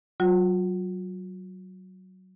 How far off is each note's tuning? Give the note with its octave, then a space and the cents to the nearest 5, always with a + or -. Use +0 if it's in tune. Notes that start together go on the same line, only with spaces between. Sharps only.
F#3 +15 F4 +45